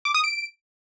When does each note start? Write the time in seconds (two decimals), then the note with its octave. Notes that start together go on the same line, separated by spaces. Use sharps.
0.05 D6
0.14 D#6
0.24 D7